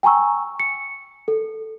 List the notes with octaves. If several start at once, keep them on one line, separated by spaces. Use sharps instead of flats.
G5 G#5 A#5 C#6 E6
C#7
A4